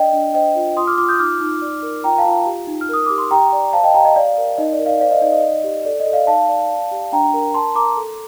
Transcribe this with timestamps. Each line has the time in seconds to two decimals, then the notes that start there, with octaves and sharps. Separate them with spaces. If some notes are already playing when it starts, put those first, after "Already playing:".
Already playing: D4 D5 D#5 G5
0.13 D4
0.34 C5 D#5 G5
0.55 F4
0.77 F4 C6 D#6
0.87 D6 F6
0.98 F4 D6 F6
1.09 D#6 G6
1.19 D#4 D6 F6
1.40 D#4
1.62 D5
1.82 A#4
2.04 F4 G5 A#5
2.18 F5 A5
2.25 F4
2.46 G4
2.67 D#4
2.81 F6
2.89 A#4 D#6
3.06 G4 D6
3.18 C6
3.31 G4 G5 A#5
3.52 D5
3.73 C5 F5 A5
3.84 D#5 G5
3.94 G4 G5 A#5
4.05 D#5 G5
4.16 D5 F5
4.37 A#4
4.58 D#4 D#5
4.73 D5
4.79 A#4
4.86 D5 F5
5.00 C5 D5 F5
5.11 D#5
5.22 D#4 D5
5.32 D#5
5.44 D5
5.64 G4
5.85 A4 D5
6.00 D#5
6.06 A4
6.13 D5 F5
6.27 D#4 F5 A5
6.49 D5
6.69 D5
6.91 G4
7.12 D4 G5 A#5
7.34 A#4
7.54 A#4 A5 C6
7.75 A#4 A#5 D6
7.97 A4